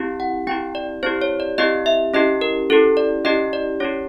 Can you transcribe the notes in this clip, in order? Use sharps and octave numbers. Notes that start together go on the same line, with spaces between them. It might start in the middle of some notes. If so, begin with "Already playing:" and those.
Already playing: C4 E4 G4
F#5
C4 E4 G4 G5
D5
C4 E4 G4 C5
C#5
D5
C4 E4 G4 D#5
E5
C#4 E4 G4 D#5
A#4
C#4 E4 G4 A4
D5
C#4 E4 G4 D#5
D5
C#4 E4 G4 C#5